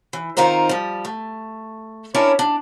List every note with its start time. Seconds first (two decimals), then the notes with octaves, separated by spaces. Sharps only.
0.13 E3
0.37 C3 D#3 D#4 F4 A#4 C5
0.69 F3 G3
1.05 A3
2.14 C#4 D4 E4 A#4 C#5
2.39 D4